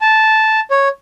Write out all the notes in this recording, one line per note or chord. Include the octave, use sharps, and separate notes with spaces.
A5
C#5